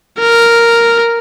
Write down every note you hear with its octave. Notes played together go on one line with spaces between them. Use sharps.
A#4